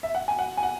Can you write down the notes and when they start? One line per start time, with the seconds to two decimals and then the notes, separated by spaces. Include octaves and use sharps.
0.03 E5
0.15 F#5
0.28 G#5
0.39 F#5
0.57 G#5
0.63 F#5